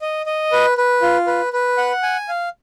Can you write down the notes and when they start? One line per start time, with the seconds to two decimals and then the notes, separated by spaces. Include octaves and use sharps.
0.01 D#5
0.26 D#5
0.52 B4
0.78 B4
1.02 F4
1.27 B4
1.53 B4
1.78 F#5
2.03 G#5
2.28 F5